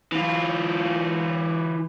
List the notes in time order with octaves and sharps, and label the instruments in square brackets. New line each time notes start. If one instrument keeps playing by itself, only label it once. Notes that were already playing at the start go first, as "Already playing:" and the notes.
[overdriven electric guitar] E3 F4